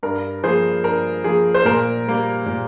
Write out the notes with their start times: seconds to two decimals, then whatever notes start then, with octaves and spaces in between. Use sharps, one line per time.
0.03 G2 A#4
0.43 F3 A#3 G#4 C5
0.84 G2 A#4
1.24 F3 A#3 G#4
1.54 C5
1.65 A#2 A#4
2.07 G3 A#3
2.46 A#2